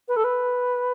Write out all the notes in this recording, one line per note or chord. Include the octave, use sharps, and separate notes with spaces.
B4
A4
B4